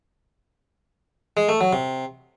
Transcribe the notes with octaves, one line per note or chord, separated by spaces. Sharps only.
G#3
A3
F#3
C3